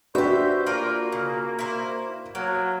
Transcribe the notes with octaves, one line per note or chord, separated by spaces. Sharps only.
D4 F#4 G4 B4 C5 E5
A#3 F4 A#4 D5
C#3
E4 C5
F#3 A#3